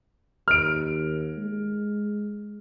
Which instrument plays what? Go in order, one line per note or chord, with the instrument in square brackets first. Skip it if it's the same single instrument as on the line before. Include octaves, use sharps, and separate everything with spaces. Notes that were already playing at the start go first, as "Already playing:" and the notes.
[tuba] D#2 [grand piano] F6 D7
[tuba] G#3